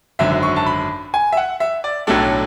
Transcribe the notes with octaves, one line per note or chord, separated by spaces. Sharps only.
G#1 F#2 D3 E5
C#6
A5
B5
G#5
E5
F#5
E5
D5
B1 A2 F#3 A3 D4 A4